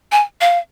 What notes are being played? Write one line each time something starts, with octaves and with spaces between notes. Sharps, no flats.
G#5
F5